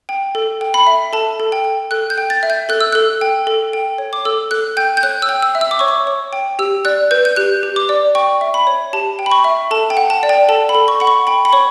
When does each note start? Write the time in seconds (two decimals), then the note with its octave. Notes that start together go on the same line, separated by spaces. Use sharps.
0.09 G5
0.35 A4
0.61 G5
0.74 B5
0.87 E5
1.13 A4 A5
1.40 A4
1.52 G5
1.64 G5
1.91 A4 F#6
2.10 G6
2.18 G5
2.30 A6
2.43 E5
2.50 G6
2.69 A4 F#6
2.80 E6
2.92 A4 F#6
3.21 G5
3.47 A4
3.73 G5
3.98 C#5
4.13 D6
4.25 A4 E6
4.51 A4 F#6
4.77 G5 G6
4.97 G6
5.03 C#5 F#6
5.22 E6
5.29 G5
5.42 E6
5.55 E5
5.61 E6
5.71 D6
5.79 C#5 C#6
5.88 D6
6.07 C#5
6.33 G5
6.59 G4 E6
6.85 D5 F#6
7.11 B4 G6
7.25 G6
7.36 G4 F#6
7.63 G4
7.76 D6
7.89 D5
8.15 G5 C#6
8.41 E5
8.54 B5
8.67 C#5
8.93 G4 A5
9.19 G5
9.26 B5
9.31 C#6
9.44 E5
9.71 A4 A5
9.90 G5
9.97 F#5
10.10 A5
10.23 D5
10.29 G5
10.49 A4 A5
10.69 B5
10.75 A4
10.88 C#6
11.00 F#5 B5
11.07 C#6
11.27 G5 B5
11.45 B5
11.53 C#5 C#6